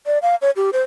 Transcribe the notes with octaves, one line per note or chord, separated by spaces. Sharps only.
D5
F5
C#5
G4
C5